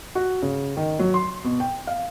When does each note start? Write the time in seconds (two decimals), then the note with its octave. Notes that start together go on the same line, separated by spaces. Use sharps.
0.15 F#4
0.42 C#3
0.77 D#3
0.99 F#3
1.14 C6
1.44 B2
1.60 G5
1.87 F5